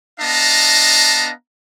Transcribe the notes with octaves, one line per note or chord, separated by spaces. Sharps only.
B3 D4 D#5 F5 A5 A#5